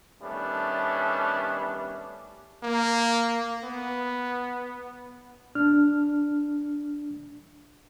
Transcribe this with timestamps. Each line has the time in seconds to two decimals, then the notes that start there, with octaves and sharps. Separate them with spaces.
0.22 D#3 G3 A3 B3 C#4 D4
2.63 A#3
3.64 B3
5.55 D4 F6